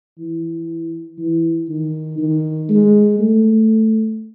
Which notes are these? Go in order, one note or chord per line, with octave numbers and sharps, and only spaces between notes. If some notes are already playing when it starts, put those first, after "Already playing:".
E3
E3
D#3
D#3
G#3
A3